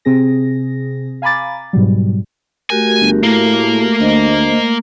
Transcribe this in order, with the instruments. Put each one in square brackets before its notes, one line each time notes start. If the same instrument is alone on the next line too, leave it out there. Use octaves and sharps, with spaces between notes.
[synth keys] C3 C4 G#4 A#6
F5 G#5 A#5 B5 D6 A6
G#2 B2 F#3 G3
[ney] A3 [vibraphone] F#4 G4 A#4 [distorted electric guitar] G#5
[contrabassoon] G1
[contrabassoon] A2 [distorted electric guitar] A#3
[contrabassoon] D2 [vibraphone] C5 D#5